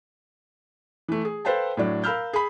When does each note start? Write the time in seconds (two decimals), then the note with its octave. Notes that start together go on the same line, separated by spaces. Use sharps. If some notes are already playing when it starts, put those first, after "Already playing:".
1.08 E3 A3
1.25 G#4
1.45 A4 B4 C5 F5 G5 A5
1.77 A2 F#3 D4
2.04 A#4 F5 B5 E6 F6 G6
2.33 G#4 B5